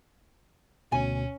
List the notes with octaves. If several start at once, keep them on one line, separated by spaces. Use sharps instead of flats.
D2 B2 C#4 G#5